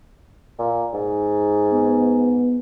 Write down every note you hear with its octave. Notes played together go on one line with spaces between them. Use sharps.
A#2
G#2
B3